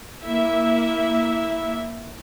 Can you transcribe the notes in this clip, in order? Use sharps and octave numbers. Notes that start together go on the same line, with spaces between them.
A#3 E4 E5